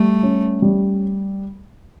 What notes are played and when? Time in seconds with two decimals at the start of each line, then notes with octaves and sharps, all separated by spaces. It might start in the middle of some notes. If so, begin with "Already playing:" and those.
Already playing: G3 A3
0.23 C#4
0.62 G3